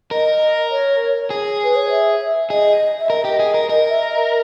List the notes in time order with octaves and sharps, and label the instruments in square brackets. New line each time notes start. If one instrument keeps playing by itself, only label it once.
[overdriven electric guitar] A#4 [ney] D#5
[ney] C#5
[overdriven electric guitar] G#4
[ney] B4
C#5
E5
[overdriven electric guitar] G#4 [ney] D#5
[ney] E5
[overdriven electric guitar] A#4 [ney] D#5
[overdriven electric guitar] G4
G#4
A#4
[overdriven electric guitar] A#4 [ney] D#5
[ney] E5
D#5